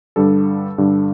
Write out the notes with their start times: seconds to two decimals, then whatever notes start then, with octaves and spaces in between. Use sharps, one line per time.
0.16 G2 D3 G3 A4
0.78 G2 D3 G3